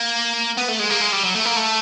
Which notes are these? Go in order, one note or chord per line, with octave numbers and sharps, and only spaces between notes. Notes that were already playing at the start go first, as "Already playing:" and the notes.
Already playing: A#3
B3
A3
G#3
A#3
G#3
G3
F#3
A3
A#3
A3